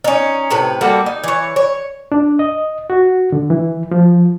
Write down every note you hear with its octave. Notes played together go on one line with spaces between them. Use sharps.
C#4 D#4
A2 C3 B4
G3 A#3 F#4 A4
D#4
E3 C#5
C#5
D4
D#5
F#4
D3
E3
F3